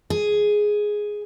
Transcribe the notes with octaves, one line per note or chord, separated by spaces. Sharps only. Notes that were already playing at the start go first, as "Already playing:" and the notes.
G#4